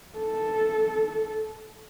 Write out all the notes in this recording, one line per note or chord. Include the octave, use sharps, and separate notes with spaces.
A4